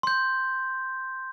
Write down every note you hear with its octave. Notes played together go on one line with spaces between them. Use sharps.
C6 G6